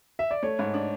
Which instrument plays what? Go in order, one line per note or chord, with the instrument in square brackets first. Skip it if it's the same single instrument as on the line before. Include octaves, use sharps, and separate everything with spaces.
[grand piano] E5
D5
[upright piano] A3 [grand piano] C#5
[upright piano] G#2
D4